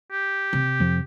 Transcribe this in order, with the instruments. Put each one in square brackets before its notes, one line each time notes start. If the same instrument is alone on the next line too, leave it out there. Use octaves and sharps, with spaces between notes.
[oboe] G4
[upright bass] C3
[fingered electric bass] F2 F3